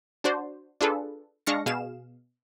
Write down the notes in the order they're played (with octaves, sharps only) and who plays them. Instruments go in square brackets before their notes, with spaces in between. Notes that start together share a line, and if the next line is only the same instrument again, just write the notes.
[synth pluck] D4 F#4 C5 D5
D4 F4 G#4 A4 B4
G#3 D4 F5 C#6 A#6 C#7
B2 G#4 F5 E7